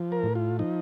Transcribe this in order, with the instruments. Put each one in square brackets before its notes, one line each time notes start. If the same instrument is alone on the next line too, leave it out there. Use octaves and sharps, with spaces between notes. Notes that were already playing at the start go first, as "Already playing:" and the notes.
Already playing: [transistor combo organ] F3
A#4
A2
F4
F3 D#4